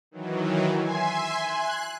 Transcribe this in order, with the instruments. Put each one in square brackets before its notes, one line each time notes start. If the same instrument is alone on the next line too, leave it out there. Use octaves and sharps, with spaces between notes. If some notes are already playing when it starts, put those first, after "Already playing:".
[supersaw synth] D#3 E3 F#3
[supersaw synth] E5 [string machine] G#5 C6
[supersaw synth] F#6